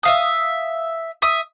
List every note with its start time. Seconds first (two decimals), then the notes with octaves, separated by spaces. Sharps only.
0.03 E5 F5 D#6
1.22 E5 D#6